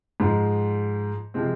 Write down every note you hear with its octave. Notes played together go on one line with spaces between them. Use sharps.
G#2 F3 G#3
C3 F3 G#3 C4